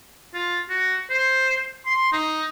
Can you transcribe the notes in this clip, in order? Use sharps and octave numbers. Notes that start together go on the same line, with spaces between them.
F4
F#4
C5
C6
D#4